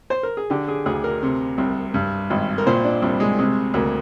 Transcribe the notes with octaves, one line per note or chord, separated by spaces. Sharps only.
C5
A#4
G#4
D3 G4
G#4
D2 G#4
A#4
C3
C2
G2
G#1
A#4
A#2 C5
D4
C2
G#3
C3 G#3
D2 A#3